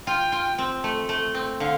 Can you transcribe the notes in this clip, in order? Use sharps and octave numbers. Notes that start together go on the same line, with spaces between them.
F4 G5
F4
C4
A3
A3
C4
D3 F5